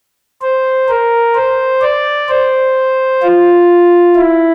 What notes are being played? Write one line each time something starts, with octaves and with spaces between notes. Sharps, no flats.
C5
A#4
C5
D5
C5
F4
E4